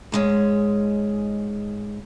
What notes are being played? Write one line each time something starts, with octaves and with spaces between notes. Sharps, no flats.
G#2 G#3 C#4